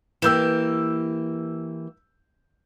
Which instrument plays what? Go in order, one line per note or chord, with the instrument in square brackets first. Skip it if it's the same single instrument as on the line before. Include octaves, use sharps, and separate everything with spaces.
[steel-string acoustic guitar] E3 A#3 G4 [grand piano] E6 G6 E7